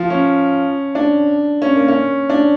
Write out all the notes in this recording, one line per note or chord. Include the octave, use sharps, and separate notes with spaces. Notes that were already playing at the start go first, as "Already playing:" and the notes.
Already playing: F3
C#4
D4
C#4
A#3
C#4
D4